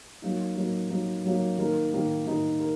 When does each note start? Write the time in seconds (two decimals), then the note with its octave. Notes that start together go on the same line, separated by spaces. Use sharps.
0.22 F#3 A#3 D#4
0.56 F#3 A#3 D#4
0.90 F#3 A#3 D#4
1.24 F#3 A#3 D#4
1.58 D#3 A#3 D#4 A#4
1.92 D#3 A#3 D#4 A#4
2.27 D#3 A#3 D#4 A#4
2.60 A#4